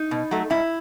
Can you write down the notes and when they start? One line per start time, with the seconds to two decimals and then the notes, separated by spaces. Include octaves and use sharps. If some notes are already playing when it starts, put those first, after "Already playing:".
Already playing: D#4
0.11 B2
0.31 F#3 A3
0.50 G#2 E4